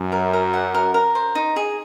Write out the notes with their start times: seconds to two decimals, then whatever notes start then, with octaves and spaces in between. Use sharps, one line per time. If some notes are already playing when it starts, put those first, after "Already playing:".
Already playing: F#2
0.12 A#4
0.33 A#4
0.54 F#5
0.74 A#4
0.94 A#4
1.15 C5
1.35 D#4
1.56 G#4